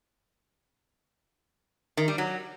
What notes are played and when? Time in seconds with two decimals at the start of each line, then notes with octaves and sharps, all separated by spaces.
1.97 D#3
2.08 G3
2.18 F#3